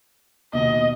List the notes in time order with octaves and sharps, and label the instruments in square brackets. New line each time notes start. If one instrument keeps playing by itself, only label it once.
[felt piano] D#2 B2 [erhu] D#5